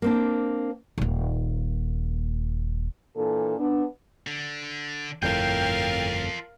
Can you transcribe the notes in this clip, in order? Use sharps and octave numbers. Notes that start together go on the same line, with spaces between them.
A#3 C4 D4
D#1 A#3
A#2 E3 D4 A4
B3 D4
D3
G1 F2 A2 F4 A4 A#4 F5 G5